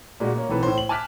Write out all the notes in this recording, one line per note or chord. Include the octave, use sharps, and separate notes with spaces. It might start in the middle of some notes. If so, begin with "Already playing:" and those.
A#2 G#3 D4 F#4
A#3 C#4
B1 E3 C4 A4 B4
A2 C5
F#7
G#5 A5 D6 F6 F#6 B6